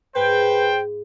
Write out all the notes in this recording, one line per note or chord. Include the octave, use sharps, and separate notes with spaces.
G#2 B4 C5 G5